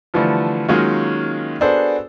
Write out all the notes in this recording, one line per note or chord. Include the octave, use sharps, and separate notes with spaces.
D3 E3 F3 G3 A3
D#3 F#3 G#3 A#3 C#4 F4
B3 D4 F#4 G#4 A4 C5